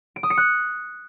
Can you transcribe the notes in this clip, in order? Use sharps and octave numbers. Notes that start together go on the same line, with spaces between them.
D7
D#6
C#7
F#6